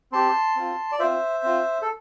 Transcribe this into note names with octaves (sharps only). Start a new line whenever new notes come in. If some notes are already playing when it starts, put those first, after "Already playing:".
C4 G4 A5 C6
C4 F4
D5
C4 F4 C5 E5
C4 F4
A4